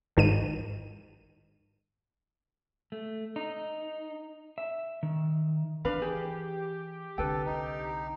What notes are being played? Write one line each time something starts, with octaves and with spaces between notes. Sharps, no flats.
G#1 D#3 D#7
A3
D#4
E5
D#3
E3 D4 B4 F5
G4 G#4
C2 D3 A4 B4 G5
D#4